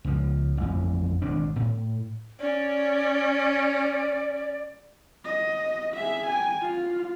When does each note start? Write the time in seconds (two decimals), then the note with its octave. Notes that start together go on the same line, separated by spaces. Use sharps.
0.05 C#2 F3
0.57 A1 F2
1.22 G#1 B2 D#3 D4
1.56 A2
2.40 C#4 D5
5.25 D#5
5.95 G#4 E5
6.27 G5 G#5
6.62 F4